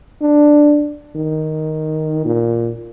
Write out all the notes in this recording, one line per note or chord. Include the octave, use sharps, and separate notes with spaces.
D4
D#3
A#2